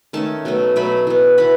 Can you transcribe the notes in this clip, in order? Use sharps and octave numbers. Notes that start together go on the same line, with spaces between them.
D#3 A3 C#4 A5
B2 F#3 A3
B2 F#3 A3 B5
E3 B3
E3 B3 B5